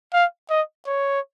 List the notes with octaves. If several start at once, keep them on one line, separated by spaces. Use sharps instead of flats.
F5
D#5
C#5